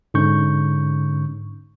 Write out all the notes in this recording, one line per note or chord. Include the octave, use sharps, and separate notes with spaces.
G#2 D3 C#4 C#6 G6